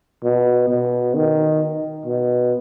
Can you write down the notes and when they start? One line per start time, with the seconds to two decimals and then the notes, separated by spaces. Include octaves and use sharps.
0.23 B2
0.68 B2
1.14 D#3
2.06 B2